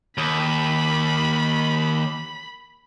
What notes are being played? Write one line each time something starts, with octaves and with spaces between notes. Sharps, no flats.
D#2 B5